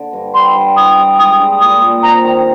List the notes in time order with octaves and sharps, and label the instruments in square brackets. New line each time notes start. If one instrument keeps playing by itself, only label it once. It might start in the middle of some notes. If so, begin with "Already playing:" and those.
Already playing: [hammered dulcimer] D3
G2
[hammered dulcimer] G3 [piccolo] C6
[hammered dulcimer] G3
[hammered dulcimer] G3 [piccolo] D#6
[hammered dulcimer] G3
[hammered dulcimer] G#3 [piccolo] D#6
[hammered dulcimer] D4
[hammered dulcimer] A#2 [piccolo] D#6
[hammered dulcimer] A#2
[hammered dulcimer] C4 [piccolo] A#5
[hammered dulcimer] D#3